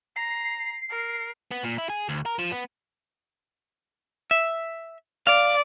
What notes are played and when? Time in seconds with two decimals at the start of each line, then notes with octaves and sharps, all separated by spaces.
0.16 A#5 C7
0.90 A#4
1.51 B3
1.63 A#2
1.78 E4
1.90 G#4
2.09 D2
2.26 A#4
2.39 F3
2.52 B3
4.31 E5
5.27 D5 F5